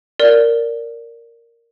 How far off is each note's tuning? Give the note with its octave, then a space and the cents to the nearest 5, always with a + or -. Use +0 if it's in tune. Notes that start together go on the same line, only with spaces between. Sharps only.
A#4 -5 D5 -10